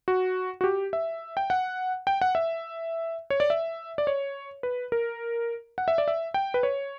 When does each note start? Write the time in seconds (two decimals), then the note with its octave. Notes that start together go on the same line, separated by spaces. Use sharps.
0.08 F#4
0.61 F#4
0.64 G4
0.93 E5
1.37 G5
1.50 F#5
2.07 G5
2.21 F#5
2.35 E5
3.30 C#5
3.40 D5
3.50 E5
3.98 D5
4.07 C#5
4.63 B4
4.92 A#4
5.78 F#5
5.88 E5
5.98 D5
6.08 E5
6.34 G5
6.54 B4
6.63 C#5